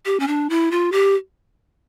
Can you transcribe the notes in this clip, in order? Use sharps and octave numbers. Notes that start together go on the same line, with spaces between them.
G4
C#4
D4
E4
F4
G4